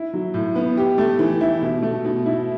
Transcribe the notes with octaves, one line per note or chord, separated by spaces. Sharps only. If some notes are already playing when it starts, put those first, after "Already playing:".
Already playing: E4
F#3
A2
B3
G4
A3
E3
E4
B2
A3
B2
E4